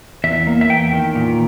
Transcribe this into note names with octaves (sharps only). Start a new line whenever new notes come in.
E2 E5
A#3
E5
E2 G5
D#3
A#2